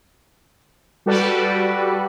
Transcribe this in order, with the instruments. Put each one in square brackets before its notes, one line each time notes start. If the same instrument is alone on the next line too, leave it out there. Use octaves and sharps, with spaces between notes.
[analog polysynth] G3 F#4 G4 A4 B4 D5